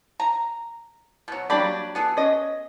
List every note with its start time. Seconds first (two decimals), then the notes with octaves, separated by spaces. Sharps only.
0.20 A#5
1.28 B2 F#3
1.50 F#3 G3 A#3 D4 G4 B5
1.95 B3 G#4 A4
2.17 C#4 D#5